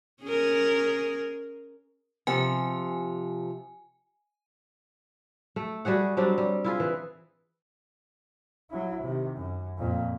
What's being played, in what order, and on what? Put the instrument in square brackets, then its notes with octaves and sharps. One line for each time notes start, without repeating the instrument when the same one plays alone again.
[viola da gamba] C#4 G#4 A#4
[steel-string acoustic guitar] C3 F3 [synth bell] G#5
[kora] A3
G3 F#4 G#4 F#5
F#3 G3 C4 D4
G3
E4 F4 G#4
E3
[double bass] F#3 E4
C3 D#3
F#2
F2 A#2